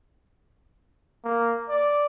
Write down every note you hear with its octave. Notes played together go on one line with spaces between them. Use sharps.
A#3
D5